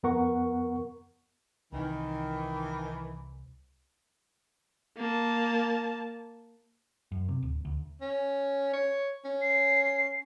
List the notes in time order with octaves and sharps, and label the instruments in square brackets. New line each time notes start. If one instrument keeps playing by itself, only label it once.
[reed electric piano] F2 B3 A#4 F#5 C#6
[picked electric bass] C2 [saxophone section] D#3 E3
[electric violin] A#3 A5
[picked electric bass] F#2
C3
D1
D2
[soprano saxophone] C#4
C#5
C#4
[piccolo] C7